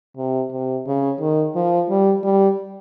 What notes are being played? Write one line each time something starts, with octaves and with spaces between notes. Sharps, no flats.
C3
C3
C#3
D#3
F3
G3
G3